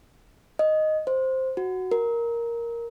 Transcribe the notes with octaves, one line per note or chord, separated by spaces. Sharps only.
D#5
C5
F#4
A#4